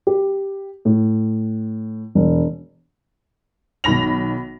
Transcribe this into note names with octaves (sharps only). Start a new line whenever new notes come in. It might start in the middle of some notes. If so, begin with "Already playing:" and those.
G4
A2
E1
B1 D#3 B5 A#6 F7